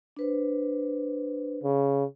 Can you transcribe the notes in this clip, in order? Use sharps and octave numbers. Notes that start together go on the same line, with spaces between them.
D4 B4 C5
C#3